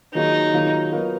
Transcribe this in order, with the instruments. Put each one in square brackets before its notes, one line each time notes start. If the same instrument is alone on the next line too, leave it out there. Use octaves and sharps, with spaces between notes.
[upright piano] D#3 F#3 A#3 F4 G#4 [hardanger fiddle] D#4
[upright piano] D#3 F#3 A#3 F4 G#4
F#3 B3 F4 A#4